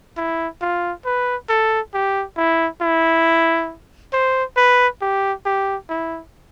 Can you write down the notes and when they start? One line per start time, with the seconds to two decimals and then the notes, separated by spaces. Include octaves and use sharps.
0.17 E4
0.61 F4
1.05 B4
1.49 A4
1.93 G4
2.37 E4
2.81 E4
4.13 C5
4.56 B4
5.01 G4
5.45 G4
5.89 E4